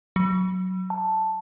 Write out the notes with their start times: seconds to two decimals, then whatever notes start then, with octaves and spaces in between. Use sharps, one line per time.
0.16 F#3
0.90 A5